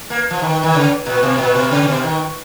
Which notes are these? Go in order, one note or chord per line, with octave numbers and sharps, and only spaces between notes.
A#3
F3
D#3
D#3
C#3
A#2
B2
A#2
B2
C#3
C#3
B2
D#3